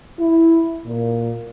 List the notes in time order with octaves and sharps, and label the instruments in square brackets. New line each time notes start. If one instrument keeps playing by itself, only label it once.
[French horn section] E4
A#2